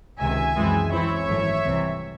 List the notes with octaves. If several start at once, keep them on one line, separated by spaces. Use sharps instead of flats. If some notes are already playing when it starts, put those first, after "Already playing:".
C#2 C3 D#3 E5 G#5
F#2 E3 G#3 C4 E4
F#2 E3 C4 E4 C#5 E5
G#1 F#2 E3 A3
C2 C3 E3